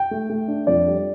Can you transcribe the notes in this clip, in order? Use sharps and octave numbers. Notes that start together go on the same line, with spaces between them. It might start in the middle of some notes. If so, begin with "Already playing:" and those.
Already playing: G5
A3
A3
D4
F2 D5
G3